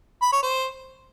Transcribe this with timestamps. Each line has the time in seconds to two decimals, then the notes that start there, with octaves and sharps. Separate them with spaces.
0.22 B5
0.32 C#5
0.43 C5